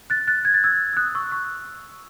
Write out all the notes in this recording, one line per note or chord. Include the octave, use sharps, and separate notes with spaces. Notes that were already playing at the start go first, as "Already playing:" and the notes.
F#6 A6
F#6 A6
G#6
A6
E6 G#6
E6
D#6 F#6
C#6 E6
C#6 E6